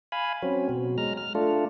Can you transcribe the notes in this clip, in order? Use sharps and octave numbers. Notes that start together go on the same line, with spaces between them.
F5 G#5 B5
F#3 C4 C#4
B2 F#3
G#3 A#5 F6
F6
A3 D4 F4 A4